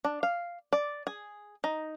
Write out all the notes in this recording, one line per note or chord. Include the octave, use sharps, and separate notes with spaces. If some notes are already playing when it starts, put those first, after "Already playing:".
D4
F5
D5
G#4
D#4